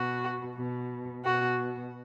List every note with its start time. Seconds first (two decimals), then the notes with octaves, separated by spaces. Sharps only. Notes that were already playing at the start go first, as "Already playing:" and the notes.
Already playing: B2 F#4
0.55 B2
1.24 B2 F#4